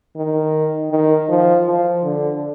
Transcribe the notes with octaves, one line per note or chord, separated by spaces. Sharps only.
D#3
D#3
F3
F3
D3